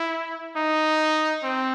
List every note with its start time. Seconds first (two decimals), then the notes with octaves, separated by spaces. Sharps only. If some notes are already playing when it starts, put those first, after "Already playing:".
Already playing: E4
0.56 D#4
1.43 C4